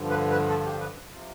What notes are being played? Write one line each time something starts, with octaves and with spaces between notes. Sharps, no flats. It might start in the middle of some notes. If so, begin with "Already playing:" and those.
Already playing: G2 D3 F3
B4
B4
A4
G4
B4
C3 F3